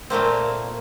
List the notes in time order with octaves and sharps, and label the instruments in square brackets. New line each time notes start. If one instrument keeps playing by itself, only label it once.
[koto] A#2 A3 A#3 C4